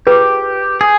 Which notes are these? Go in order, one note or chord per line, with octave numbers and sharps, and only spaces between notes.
F4 G4 G#4 B4
G#4